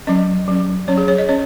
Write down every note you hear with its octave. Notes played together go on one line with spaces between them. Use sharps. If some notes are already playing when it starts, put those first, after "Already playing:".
F#3 C#4 D#5
F#3 C#4
F#3 C#4 C#5
G#4
C#5
D#5
C#4 C#5